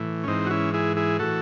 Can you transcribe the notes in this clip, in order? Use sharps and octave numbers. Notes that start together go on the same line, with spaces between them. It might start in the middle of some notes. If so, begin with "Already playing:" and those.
Already playing: A2 E3
C#4
G#2 E3 C4 D#4
F#4
C#4 E4
E4 G#4
E4 G#4
A2 E3 F#4 A4